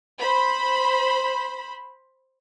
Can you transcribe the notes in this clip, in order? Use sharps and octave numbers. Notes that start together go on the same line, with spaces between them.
C5 B5